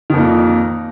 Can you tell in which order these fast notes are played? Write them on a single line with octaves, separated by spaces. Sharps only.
D#3 F2 A#2